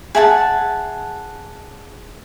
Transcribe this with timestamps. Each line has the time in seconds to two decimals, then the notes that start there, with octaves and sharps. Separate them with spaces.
0.15 G#4 E5 F#5 A5